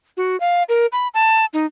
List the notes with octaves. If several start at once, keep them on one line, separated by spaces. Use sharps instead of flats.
F#4
F5
A#4
B5
A5
D#4